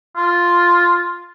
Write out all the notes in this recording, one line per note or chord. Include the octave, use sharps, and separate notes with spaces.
F4